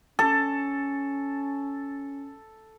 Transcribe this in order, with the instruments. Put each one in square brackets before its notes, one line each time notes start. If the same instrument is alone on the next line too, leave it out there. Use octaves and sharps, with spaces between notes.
[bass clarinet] C#4 [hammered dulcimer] A4